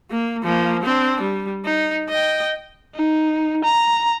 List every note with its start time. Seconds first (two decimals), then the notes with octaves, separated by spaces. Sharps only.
0.10 A#3
0.43 F3 A#3
0.83 C4 D4
1.21 G3
1.65 D#4
2.09 D#5 G5
2.95 D#4
3.64 A#5